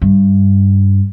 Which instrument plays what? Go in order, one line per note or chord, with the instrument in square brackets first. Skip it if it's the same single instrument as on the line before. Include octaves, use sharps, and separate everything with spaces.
[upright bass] G2